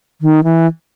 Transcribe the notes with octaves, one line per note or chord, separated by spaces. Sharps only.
D#3
E3